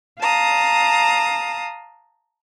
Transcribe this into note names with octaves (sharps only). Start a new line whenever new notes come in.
F5 A5 A#5 D#6